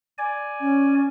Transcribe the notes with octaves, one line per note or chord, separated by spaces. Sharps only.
D5 G#5
C#4